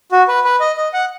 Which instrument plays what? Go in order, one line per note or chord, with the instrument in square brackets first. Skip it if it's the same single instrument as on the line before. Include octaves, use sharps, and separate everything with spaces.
[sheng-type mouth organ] F#4
B4
B4
D#5
D#5
F#5